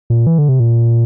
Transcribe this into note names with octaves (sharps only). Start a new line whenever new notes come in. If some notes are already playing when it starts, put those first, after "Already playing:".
A#2
E3
D3
C3
A#2